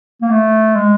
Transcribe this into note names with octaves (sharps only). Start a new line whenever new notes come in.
A#3
A3
G#3